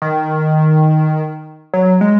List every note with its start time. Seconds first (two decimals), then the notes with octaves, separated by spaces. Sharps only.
0.02 D#3
1.74 F#3
2.01 G#3